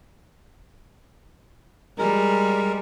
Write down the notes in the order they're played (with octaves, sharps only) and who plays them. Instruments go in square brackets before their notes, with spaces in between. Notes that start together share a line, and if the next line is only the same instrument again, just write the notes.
[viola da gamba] G3 [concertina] G#3 A#4